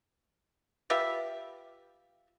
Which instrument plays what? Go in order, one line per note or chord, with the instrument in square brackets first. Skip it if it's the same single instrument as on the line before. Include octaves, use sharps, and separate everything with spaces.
[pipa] F4 G4 B4 E5